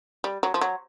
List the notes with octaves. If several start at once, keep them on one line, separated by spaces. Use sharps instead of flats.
G3
F#3
F3
F#3